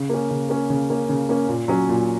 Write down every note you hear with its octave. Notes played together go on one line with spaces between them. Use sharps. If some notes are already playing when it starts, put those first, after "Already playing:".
Already playing: C#3
A#3 C#4
C#3
A#3 C#4
C#3
A#3 C#4
C#3
A#3 C#4
A#2
F#3 C#4
A#2